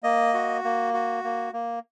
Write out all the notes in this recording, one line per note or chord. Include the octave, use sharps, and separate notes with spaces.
A#3 D#5
F#4
A#3
F#4
A#3
A#3